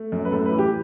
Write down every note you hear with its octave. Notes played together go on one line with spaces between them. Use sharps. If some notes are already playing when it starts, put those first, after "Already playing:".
Already playing: A3
F#2
B4
A2 A4
B4
E3
G4